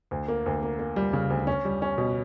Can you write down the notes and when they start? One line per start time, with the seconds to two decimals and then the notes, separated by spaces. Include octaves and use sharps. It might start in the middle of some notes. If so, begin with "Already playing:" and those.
0.11 D2
0.28 A#3
0.46 D2
0.63 A#3
0.79 A#3
0.96 G3
1.13 C#3
1.30 D2
1.47 C#4
1.65 G3
1.82 C#4
1.98 B2